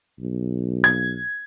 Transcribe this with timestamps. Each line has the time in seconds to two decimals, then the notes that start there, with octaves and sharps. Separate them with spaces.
0.19 B1
0.84 G#6